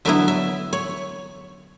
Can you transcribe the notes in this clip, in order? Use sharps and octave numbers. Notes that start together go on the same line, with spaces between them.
D3 F#3 B3 E4 E5
E5
C#5